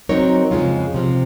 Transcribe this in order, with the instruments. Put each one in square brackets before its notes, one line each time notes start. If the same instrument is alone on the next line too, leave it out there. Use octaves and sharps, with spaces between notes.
[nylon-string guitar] F#3 C4 D#4 A#4 C#5
F2 C#3 G#3 C#4 F4
C3 F3 C4